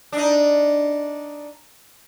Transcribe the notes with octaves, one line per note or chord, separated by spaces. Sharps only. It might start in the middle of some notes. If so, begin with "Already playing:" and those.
D4 D#4